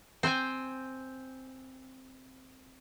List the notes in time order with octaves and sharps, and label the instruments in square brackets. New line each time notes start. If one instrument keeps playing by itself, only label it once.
[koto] C4 C5 G5 G#5